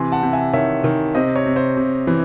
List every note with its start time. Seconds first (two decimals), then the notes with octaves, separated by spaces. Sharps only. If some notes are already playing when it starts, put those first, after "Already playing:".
Already playing: C3 E3 G#5 C6
0.12 F#5 A5
0.23 C3
0.33 E5 G#5
0.53 D#3 C#5 E5
0.84 D#3
1.15 C3 C5 D#5
1.36 C#5
1.46 C3
1.56 C5
1.77 C3
2.07 E3